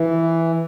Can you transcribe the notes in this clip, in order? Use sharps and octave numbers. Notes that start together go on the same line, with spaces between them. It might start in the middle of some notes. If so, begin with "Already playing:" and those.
Already playing: E3